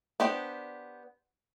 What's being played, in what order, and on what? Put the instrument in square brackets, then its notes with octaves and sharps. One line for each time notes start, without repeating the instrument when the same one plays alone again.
[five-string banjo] B3 D4 G4 C5 G5